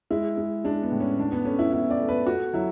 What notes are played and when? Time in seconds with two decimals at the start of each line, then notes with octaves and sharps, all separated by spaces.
0.11 G#3 E4
0.38 G#3
0.65 G#3 D4
0.83 B3
0.91 A2
1.00 C#4
1.18 E2 D4
1.32 B3
1.45 A3 C#4
1.59 E4
1.72 E2 E4
1.91 D5
2.00 A3
2.09 B4
2.27 A3 F#4
2.53 F#3 E4